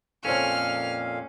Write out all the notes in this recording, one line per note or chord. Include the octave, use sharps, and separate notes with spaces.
F2 A#2 C#4 A4 C5 C#5 F5 F6